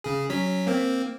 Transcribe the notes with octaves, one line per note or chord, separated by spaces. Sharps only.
C#3 G#4
F#3 C#4 B6
A#3 C4